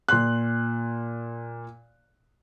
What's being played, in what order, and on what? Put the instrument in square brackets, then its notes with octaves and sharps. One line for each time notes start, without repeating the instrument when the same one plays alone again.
[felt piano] A#2 C6 F#6